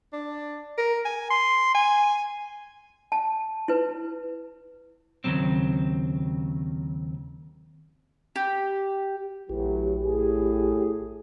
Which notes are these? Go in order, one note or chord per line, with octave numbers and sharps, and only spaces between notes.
D4
A#4
G#5
C6
G#5
A5
E4 B4
D#2 A#2 C#3 F#3 C4
G4
A#1 A2 E3 F#3 G4
A2 G#4